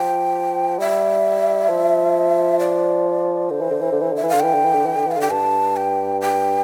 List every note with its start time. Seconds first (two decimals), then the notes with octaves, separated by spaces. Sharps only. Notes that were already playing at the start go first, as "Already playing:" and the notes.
Already playing: F3 G5
0.79 G3 E5
1.69 F3
2.59 D5
3.50 D3 C5
3.61 E3
3.71 D3
3.81 E3
3.92 D3
4.02 E3
4.12 D3 E5
4.23 E3
4.29 D3 F5
4.40 E3 G5
4.54 D3
4.65 E3
4.75 D3
4.86 E3
4.96 D3
5.07 E3 F5
5.17 D3 G5
5.31 G2 A5
5.76 G5
6.21 G5